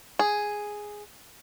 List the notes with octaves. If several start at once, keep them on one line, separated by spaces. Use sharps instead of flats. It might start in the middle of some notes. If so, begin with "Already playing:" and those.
G#4